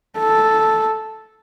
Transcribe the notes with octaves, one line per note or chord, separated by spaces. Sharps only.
A4